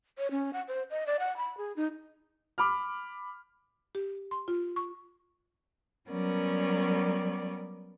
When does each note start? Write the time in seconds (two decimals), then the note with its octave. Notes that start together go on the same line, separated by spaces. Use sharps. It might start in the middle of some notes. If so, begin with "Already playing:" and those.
0.18 C#5
0.31 C#4
0.53 F#5
0.68 C5
0.90 D#5
1.07 D5
1.20 F#5
1.37 B5
1.57 G#4
1.76 D#4
2.58 B5 D6 F6
3.95 G4
4.31 C6
4.48 F4
4.76 C#6
6.10 F#3 G3 B3 C#4 A#4 D5